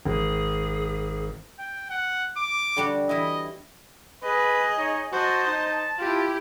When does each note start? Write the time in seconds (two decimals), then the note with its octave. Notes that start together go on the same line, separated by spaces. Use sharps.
0.06 G#1 G#4
1.59 G5
1.90 F#5
2.37 D6
2.77 D3 G3 F#4
3.09 E3 E4 D#5
4.24 G#4 B4 D#5
4.78 D#4 C#5
5.12 F#4 C5 D#5 A5
5.47 D#4
5.99 E4 F4 G4